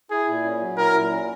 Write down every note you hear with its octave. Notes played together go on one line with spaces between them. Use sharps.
E4 G#4
A#2
C#4
F#3
E4 A#4
A#2
C#4